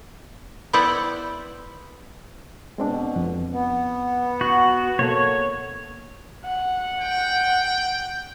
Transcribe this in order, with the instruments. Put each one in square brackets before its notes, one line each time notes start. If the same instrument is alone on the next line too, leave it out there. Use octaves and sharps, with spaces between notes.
[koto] B3 E4 C5 D5 F#5 G5
[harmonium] B2 [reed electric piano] G#3 C4 D4
[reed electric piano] F2
[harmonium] B3
[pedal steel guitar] F#4
[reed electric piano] B2 A#3 A4 [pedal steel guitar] C#5
[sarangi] F#5
[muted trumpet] G5